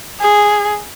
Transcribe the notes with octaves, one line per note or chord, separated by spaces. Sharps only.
G#4